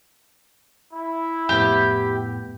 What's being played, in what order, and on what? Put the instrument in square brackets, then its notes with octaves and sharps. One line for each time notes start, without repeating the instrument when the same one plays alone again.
[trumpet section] E4
[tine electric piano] F2 A2 B3 [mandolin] G4